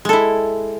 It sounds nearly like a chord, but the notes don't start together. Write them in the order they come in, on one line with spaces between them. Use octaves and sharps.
G#3 A4 E4